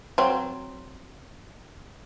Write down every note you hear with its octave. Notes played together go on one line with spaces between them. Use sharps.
F#3 C4